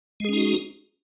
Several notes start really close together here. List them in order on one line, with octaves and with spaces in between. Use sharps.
G#3 G#4 C#4 D#4 F#4